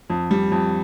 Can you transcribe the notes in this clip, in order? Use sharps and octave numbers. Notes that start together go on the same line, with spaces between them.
F2
G3
F2